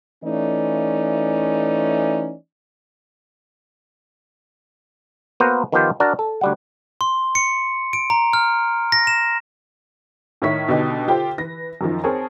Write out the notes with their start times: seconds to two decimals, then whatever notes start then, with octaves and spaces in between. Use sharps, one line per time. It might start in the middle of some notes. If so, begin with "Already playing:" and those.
0.24 E3 A3 C#4 D#4 D5
5.40 A#3 B3 F#4 A#4 C5 F#5
5.72 D#3 F3 B3 F4 G4 C5
6.00 D4 F#4 A#4 D5
6.19 A4
6.41 D2 G3 F#5
7.01 C6
7.35 C#7
7.93 D7
8.10 A#5
8.33 F6
8.92 A#6
9.07 E7
10.42 A2 D#3 E4 C#5 B6
10.68 B2 D3 D#4 G4
11.08 F4 G4 A4 C5 G5
11.38 E3 B4 A#6
11.81 F#2 D#3 F3
12.04 C4 G#4 A#4 C#5 A5